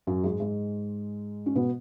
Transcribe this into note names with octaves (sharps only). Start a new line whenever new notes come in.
F#2 F#3
G#2 G#3
G#2 G#3
C#4
B2 B3